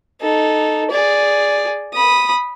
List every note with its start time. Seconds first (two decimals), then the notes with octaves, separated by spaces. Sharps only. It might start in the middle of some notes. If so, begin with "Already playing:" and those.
0.21 D#4 A4
0.90 G#4 D5
1.94 B5 D#6